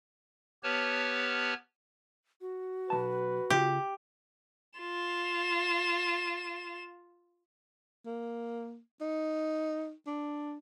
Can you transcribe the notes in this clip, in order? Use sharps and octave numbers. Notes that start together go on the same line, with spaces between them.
B3 G4 B4 C#5 A5 F6
F#4
B1 D#3 B4 A5
C#3 F4 G4
F4 E7
A#3
D#4
D4